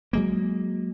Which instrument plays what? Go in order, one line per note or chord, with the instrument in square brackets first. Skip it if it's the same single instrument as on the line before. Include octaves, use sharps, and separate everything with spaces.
[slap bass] F#3 G#3 A#3